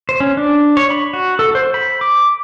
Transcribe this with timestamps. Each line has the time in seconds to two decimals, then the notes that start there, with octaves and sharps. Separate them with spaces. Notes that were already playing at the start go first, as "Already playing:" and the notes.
0.09 C5
0.20 C#4
0.37 D4
0.77 C#5
0.90 B5
1.13 F#4
1.39 A4
1.55 C5
1.74 B5
2.01 D6